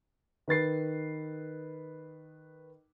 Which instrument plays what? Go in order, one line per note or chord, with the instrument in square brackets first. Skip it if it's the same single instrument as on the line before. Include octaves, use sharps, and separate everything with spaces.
[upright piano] D#3 B4 A6 C7